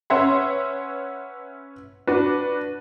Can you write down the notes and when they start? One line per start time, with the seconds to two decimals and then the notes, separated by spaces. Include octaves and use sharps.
0.10 C#4 B4 C#5 E5 F#5 C6
2.07 D4 F#4 B4